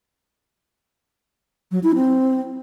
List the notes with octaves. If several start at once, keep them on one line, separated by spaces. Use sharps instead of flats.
F#3
E4
C4